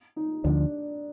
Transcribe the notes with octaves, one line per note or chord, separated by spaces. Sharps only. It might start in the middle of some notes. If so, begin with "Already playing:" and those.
D#4
D2 D3 F3 D4